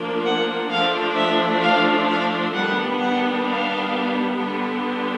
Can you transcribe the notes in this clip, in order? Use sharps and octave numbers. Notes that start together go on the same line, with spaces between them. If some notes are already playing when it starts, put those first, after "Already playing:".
Already playing: F3 A#3 D4
F#5
F3 A3 D4 F5
E5
F5
F5
D#3 G3 B3 D4 F#5
F#5
F5
D3 G3 B3 D4